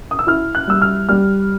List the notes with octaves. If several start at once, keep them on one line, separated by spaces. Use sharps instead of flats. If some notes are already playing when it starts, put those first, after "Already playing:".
D#6
E6
E4 F6
F#6
G3 E6
F6
G3 F6